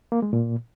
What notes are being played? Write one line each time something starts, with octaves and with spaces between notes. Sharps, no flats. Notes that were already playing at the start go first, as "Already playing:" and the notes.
A#3
G#3
A#2